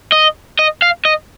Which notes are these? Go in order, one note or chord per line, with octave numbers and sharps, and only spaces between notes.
D#5
D#5
F5
D#5